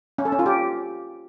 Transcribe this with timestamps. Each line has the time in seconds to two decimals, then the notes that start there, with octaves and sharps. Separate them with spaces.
0.18 C#4
0.25 A4
0.32 C#4
0.39 F4
0.46 G4